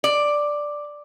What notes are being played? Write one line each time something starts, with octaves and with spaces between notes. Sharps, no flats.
D5